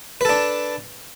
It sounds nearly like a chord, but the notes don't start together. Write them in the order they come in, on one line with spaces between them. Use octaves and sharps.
B4 A4 D4